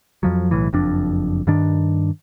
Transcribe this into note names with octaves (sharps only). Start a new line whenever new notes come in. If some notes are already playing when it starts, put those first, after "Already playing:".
F2 F3 F#3
B1 A2 E3
F#1 F2 D4
G2 D#3 D4